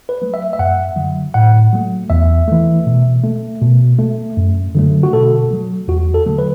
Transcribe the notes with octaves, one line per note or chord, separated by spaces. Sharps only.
B4
F#3 A3
E5
E5
F#2 F#5
D3 F#3
A2 F#5
F#3 A3
E2 E5
E3 A3
B2
A3
B2
A3
F#2
D3 F#3 A3
F#4
B2 A4
F#3 A3
E2 F#4
A4
D3 F#3 A3
B4